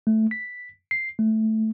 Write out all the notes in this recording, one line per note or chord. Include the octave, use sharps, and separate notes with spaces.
A3
B6
C7
A3